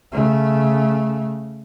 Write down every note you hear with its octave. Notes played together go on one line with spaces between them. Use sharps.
C#3 A3